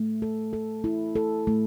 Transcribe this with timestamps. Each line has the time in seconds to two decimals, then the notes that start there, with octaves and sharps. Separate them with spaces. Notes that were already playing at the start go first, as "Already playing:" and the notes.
Already playing: A3
0.22 A4
0.53 A4
0.84 E4
1.16 A4
1.47 A3